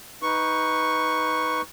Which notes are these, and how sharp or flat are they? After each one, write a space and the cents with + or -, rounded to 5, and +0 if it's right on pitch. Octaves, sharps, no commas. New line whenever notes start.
D#4 +15 B4 +0 C#6 +0